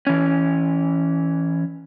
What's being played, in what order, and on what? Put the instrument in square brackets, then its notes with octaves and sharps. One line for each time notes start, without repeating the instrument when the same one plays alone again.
[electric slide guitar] E3 C#4